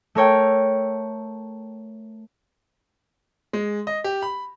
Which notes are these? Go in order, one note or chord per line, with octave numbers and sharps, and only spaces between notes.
A3 A#4 C#5 G5
G#3
D#5
G4
B5